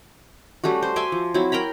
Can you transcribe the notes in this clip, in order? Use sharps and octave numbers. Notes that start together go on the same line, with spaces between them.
G3 A3 C#4 F#4
C5
E5 G#5 C6 D6
F3
F#3 C4 E4 C#5
A#4 G5 A#5 B5